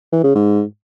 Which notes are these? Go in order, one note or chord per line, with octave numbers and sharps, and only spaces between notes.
E3
C#3
G#2